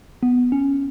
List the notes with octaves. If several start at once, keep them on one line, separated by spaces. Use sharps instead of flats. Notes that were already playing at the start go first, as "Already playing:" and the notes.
B3
C#4